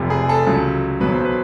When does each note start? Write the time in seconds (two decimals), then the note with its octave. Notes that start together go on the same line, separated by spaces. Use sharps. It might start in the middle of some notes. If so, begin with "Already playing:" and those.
Already playing: F1 F2 C3
0.10 G#4
0.29 A4
0.46 C#2 C#3 F#3
1.00 B1 B2 F#3 B4
1.12 C5
1.25 B4